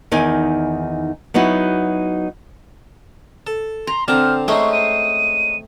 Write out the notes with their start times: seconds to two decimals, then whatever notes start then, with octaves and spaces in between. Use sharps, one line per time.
0.12 E2 D#3 D#4 G#5
1.34 F#3 B3 D#4 E4 F#4
3.47 A4
3.87 A#5 C6
4.08 D3 C4 A5 A#5 F6
4.48 G#3 A3 C#4 D#4 C5 C#6
4.73 D#7